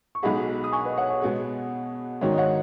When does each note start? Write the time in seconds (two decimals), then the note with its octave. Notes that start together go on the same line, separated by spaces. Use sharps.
0.15 C#6
0.23 B1 B2 G#3 D#4 G#4 F#5 B5
0.64 D#6
0.72 G#5 C#6
0.85 B4 D#5
0.98 C#5 F#5
1.10 C#5 F#5
1.22 B2 G#3 B3 G#4
2.21 G#2 D#3 F#3 C#5
2.32 D#5
2.38 C#5 F#5